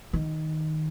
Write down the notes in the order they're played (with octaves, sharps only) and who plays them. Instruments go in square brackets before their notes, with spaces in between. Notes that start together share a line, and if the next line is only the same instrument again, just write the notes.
[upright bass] D#3